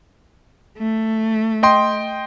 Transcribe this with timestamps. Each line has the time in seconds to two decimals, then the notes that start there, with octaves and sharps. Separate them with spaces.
0.78 A3
1.63 D#5 G5 C6